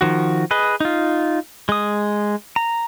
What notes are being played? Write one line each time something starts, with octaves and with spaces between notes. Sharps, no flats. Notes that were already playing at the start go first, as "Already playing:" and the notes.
D#3 F3 F#4
G#4 B4 D#5
D#4 F4
G#3 D#6
A#5